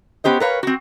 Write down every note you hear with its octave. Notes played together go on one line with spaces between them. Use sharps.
B3 C#4 G4 C5 D#5
A#4 B4 C#5 F5
C4 F#4